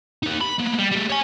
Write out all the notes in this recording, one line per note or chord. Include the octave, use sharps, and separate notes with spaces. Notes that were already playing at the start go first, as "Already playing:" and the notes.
D#4 G4
B5
A#3 B3
G3
G3 A3
C#5 G#5